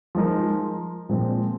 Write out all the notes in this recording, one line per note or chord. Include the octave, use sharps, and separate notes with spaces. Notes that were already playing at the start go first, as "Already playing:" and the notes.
F3 G#3 D#4 A#4
A#2 F3 G#3 C4